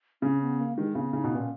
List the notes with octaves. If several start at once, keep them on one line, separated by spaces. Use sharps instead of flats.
C#3 C#4
B3
A#3
D#3 G#3
C#3 B3
C#3 D#4
B2
A#2 C#4